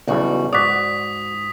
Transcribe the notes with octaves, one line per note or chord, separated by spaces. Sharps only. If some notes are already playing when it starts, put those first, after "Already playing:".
B1 E2 C#3 G3 F#4
G#2 F#4 D5 D#6 B6